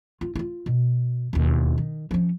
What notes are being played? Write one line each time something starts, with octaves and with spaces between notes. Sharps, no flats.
F4
E4 F4
B2
E1 D#2
D#3
F3 C#4